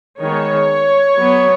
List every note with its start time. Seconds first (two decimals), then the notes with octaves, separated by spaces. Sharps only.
0.22 D#3 G#3 B3 C#5
1.15 F#3 B3